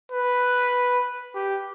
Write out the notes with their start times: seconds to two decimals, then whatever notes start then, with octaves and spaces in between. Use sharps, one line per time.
0.12 B4
1.35 G4